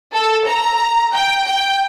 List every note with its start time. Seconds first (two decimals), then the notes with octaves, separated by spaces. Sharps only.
0.14 A4
0.47 A#5
1.15 G5
1.47 G5